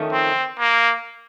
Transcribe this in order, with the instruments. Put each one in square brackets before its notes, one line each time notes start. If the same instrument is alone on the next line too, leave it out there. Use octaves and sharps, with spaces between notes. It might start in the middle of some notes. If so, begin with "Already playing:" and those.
Already playing: [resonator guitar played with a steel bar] F2 D#3 A3 C#4
[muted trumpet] C4
A#3